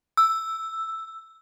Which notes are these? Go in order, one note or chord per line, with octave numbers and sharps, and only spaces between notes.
E6